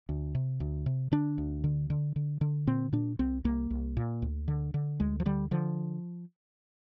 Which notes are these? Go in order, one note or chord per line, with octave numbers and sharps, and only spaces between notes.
D2
C3
D2
C3
D3 D4
D2
D3
D3
D3
D3
A#2 C4
A#2 D4
C2 C4
C2 A#3
C2
A#2
D2
D3
D3
D2 G#3
F3
D3 G3
D3 F3